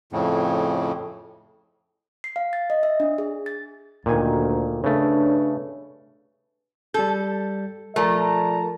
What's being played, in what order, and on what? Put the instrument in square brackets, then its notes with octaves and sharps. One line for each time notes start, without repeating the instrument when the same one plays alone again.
[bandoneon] F2 A2 C#3
[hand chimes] C7
F5
A6
D#5
E5
D4
G#4
A6
[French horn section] D2 [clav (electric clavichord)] A#2 D#3 G#5
[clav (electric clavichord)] C#3 A3 [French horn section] D4 B4 C#5
[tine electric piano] G3 G6 [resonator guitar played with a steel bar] A4
[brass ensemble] F3 A5 A#5 [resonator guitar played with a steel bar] A3 [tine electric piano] A#4 D5